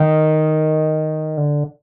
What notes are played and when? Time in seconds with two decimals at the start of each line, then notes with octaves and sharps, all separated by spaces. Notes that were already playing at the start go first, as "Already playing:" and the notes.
Already playing: D#3
1.37 D3